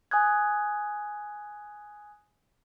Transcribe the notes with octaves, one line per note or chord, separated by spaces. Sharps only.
G#5 D#6 F#6 G#6